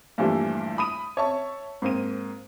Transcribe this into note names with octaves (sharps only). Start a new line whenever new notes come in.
G2 A#2 E3 F3 G3 A3
B5 D#6 D#7
C#5 E5 A5 C#6
G#2 A#3 C4 D#7